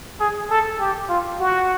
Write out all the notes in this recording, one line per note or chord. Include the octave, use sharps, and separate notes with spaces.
G#4
A4
G4
F4
F#4